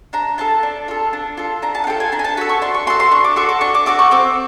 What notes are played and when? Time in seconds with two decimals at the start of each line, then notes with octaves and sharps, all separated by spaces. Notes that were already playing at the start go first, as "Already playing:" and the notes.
0.13 D4 A#5
0.38 F4 A4 A5
0.63 D4
0.88 F4 A4
1.13 D4
1.37 F4 A4
1.62 D4 A#5
1.75 A5
1.84 F#5
1.87 F4 A4 G5
2.00 G#5
2.12 D4 A#5
2.19 G#5
2.24 A5
2.37 F#4 B5
2.41 A4
2.49 C#6
2.62 D4 C6
2.74 C#6
2.87 F#4 A4 C6
3.00 C6
3.11 D4 C#6
3.24 D6
3.36 F#4 A4 C#6
3.49 D6
3.61 D4 C#6
3.74 D6
3.86 F#4 A4 D6
3.99 C#6
4.11 C4 D6